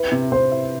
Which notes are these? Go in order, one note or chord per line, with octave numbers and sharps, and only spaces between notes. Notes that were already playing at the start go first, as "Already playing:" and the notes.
Already playing: E4 B4
C3
C3 C5
E4